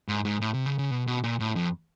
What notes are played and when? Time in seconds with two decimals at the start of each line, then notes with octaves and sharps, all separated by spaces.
0.08 G#2
0.25 G#2
0.41 A2
0.54 C3
0.66 C#3
0.79 C#3
0.91 B2
1.07 B2
1.24 A#2
1.40 A2
1.56 F2